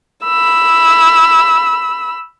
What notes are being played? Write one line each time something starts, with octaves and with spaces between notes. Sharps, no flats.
B5 E6